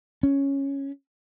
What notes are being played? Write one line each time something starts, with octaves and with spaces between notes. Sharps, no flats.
C#4